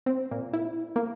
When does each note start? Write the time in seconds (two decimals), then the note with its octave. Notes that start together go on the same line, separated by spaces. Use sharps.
0.06 C4
0.31 A#2
0.53 E4
0.96 A#3